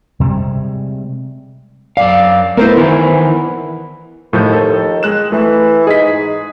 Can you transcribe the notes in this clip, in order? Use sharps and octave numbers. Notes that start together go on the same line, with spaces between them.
C3 G3 G#3
F#2 D5 F5
A3 B3 E4 A#4 C5
D#3 E3 B3 E4
D#2 A2 D#3 F3 G6
A4
G#3 F#6 E7
E3 A3
G#2 G#3 G#4 B6